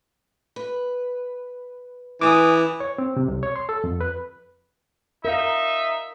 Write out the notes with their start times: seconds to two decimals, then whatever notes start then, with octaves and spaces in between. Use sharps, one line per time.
0.56 B4
2.21 E3 G#4 B4 G#5 D6 D#6
2.80 C#5
2.98 C4
3.17 C3
3.28 C2
3.43 C#5
3.56 C6
3.69 A4
3.84 F2
4.01 B4
5.25 D#4 A#4 E5 F5